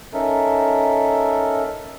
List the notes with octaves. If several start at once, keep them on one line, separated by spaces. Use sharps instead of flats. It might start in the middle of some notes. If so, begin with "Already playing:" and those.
C#4 D#4 A4 A#4 E5